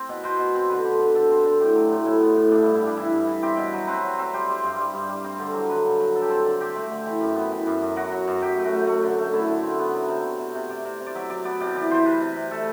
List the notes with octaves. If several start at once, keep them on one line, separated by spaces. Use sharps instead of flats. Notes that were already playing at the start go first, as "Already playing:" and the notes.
Already playing: C4
B2
B2 C5
B2
C4
D3 B4
D3
D3
D3 A4
C4
D3
A2 G4
F#3
A2
A2 E4
B3
A2
G2 D4
G2 E4
E4
G3 D4
E3 E4
G2
E3
C4 G4
B2
F#3
C4 B4
F#3
C4
G3 C5
G3
G2
G3
G2
G3
C4
D3
F#3
D3 B4
G2
F#3
D3 A4
G4
C4 A4
D3
C4 G4
A3
D3
E3
F#2
B3
E3
F#2
F#2
F#3 F#4
F#3
F#2
F#3 G4
A3
F#4
A3
A3
D3
A3
D3 E4
D3
C4
B3
F#3
C3
B3
C3
C3
C3 D5
C3
C3
D5
F#3 E5
F#3 D5
B3 D5
C3 D5
E3 D5
E3 C5
C3 B4
C3
C3
A3 A4